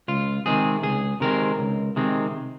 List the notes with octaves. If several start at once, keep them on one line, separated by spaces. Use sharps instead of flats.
C#2 F4
C3 D#3 G#3 C4 G#4
C#2 G#4
C3 D#3 G#3 C4 A#4
C#2
C3 D#3 G#3 C4